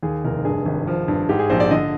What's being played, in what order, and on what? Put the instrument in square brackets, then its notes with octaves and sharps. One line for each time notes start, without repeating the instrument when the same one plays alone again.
[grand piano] D#2 G#4
F1 A#4
G2 G#4
G#1
F3
G2
G#2 G4
G#4
A#1 C5
D5
D3 D#5